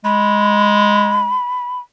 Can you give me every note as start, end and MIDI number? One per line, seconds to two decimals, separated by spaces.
0.05 1.36 56
0.05 1.79 83